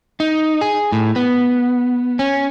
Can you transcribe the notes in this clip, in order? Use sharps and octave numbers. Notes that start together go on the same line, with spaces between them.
D#4
G#4
A2
B3
C#4